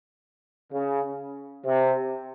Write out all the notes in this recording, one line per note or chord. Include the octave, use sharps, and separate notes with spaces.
C#3
C3